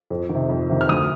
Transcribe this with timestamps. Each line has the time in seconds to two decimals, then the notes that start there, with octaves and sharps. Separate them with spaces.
0.10 F2
0.29 D#3
0.35 C3
0.50 F2
0.69 C3 D#3
0.81 F6
0.89 D2 D#6